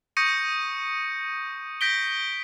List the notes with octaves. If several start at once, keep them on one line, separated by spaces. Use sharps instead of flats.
C#6 D#6 G6 A#6 C#7 D#7
G6 A#6 B6 D7 G7